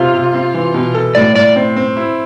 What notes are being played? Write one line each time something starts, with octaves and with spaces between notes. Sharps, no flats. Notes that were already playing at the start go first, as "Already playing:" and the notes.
Already playing: C3 C4 F4
C3
C4
E3
B2
A4
A2 D5
A2 D5
C4
C4
E4